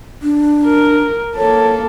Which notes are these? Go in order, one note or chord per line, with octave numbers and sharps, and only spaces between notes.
D4
A#4
A#3 A4 C#5